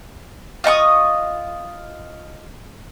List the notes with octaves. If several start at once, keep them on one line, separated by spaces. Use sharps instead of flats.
F4 D#5 C#6 D#6